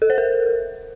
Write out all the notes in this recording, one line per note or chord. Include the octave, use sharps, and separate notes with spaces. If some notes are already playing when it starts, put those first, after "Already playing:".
A4
C5
A#4